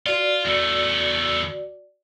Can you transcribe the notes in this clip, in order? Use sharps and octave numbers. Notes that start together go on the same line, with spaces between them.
F4 F#4 D5
E2 A3